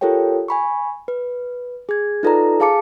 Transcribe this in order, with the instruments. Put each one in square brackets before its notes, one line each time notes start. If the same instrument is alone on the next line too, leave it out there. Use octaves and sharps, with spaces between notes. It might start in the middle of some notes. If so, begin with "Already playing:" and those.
[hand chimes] F4 G4 A4 A#4 C#5 G5
G#5 B5 C#6
B4
G#4 G#6
D#4 F4 A4 B4 D5 A#5
G#4 F5 A5 D6 C#7